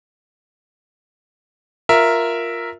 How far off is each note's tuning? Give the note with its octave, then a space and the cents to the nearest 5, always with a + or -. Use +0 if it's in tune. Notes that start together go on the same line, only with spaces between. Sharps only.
F4 +10 A#4 +0 E5 +0